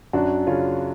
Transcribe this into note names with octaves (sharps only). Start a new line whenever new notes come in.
F#2 D4 F#4
C#3 C#4 F4